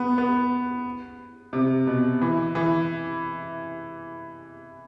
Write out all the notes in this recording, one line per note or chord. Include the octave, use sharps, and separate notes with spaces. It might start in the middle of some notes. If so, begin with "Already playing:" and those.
Already playing: B3
B3
C3
B2
E3
E3